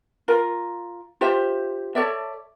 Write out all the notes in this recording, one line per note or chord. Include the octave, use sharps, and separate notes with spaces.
F4 A#4
F4 G4 C5 E5
A4 C#5 D5 E5